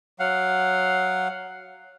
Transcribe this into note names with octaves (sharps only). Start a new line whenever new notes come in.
F#3 F5 F#5